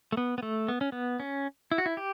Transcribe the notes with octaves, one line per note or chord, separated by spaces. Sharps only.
A3
B3
B3
A3
B3
C#4
B3
C#4
E4
F#4
E4
G4